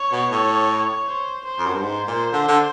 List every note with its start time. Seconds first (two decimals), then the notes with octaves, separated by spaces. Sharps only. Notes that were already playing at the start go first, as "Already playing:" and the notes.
Already playing: C#5
0.12 B2
0.31 A2
1.07 C5
1.45 C5
1.59 F2
1.66 F#2
1.75 G2
1.82 G#2 C5
2.08 A#2
2.33 D3
2.48 D3